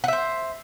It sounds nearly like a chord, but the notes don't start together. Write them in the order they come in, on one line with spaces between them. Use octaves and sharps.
F#5 E5 C5